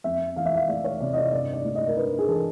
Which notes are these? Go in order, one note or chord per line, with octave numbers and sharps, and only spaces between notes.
F2 E5
E3 F5
E5
F5
A3 D5
C#5
C3 D5
D#5
D5
G2 D5
D5
A3
D#5
A#4
D4 B4
G#4
E3 A4